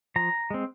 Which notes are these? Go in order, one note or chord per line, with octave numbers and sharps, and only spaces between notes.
F3 A#5
G#3 C4